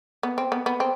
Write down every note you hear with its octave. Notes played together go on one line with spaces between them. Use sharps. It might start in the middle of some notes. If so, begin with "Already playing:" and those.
B3
C4
B3
B3
C4